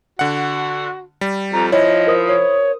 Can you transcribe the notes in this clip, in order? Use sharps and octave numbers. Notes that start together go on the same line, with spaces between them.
D3 F#4 F#5
G3
F2 A#5
F3 E4 C#5 D#5
A#4 C5 D#6
C#5